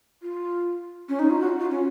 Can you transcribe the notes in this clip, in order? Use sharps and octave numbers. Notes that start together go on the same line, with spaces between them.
F4
C#4
D#4
F4
F#4
F4
C#4